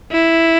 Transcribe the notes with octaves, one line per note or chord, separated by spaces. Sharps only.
E4